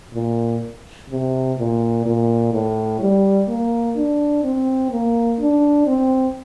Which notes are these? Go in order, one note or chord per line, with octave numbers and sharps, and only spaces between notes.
A#2
C3
A#2
A#2
A2
G3
A#3
D4
C4
A#3
D4
C4